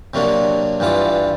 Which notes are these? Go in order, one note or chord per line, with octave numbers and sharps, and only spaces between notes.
C3 F#3 A#3 D4
G2 E3 F4 D6